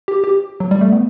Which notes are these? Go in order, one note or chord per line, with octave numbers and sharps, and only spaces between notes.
G4
G4
F#3
G3
A3
B3